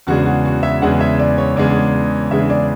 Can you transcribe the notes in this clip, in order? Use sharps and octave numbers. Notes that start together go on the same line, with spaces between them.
E2 C#3 G#3 D4 F#4
F#4
F#4
E5
E2 C#3 G#3 D4 F#5
E5
D5
C#5
E2 C#3 G#3 D4 D5
E2 C#3 G#3 D4 E5
D5